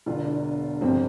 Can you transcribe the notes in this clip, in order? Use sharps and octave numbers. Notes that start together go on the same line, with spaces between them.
E1 E2 D3 F4
D4
G1 F2 C3 F3 C4